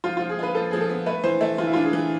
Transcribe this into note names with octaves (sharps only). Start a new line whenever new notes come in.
F3 F4
F3 F4
G#4
F4 B4
F3 A4
F3 G#4
A4
B3
A3 B4
E3 C5
A3 A4
E3 F4
E4
F4
D4
G#4
E3